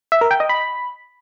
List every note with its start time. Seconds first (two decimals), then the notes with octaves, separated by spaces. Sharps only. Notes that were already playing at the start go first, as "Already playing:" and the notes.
0.12 E5
0.21 A#4
0.31 G5
0.40 D#5
0.49 B5